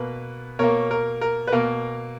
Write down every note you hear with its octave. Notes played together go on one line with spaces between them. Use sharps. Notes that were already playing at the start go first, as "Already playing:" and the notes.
Already playing: B2 A#3 B4
B2 A#3 A#4 C#5
A#4
A#4
B4
B2 A#3 A#4